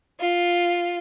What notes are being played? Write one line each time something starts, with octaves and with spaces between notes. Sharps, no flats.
F4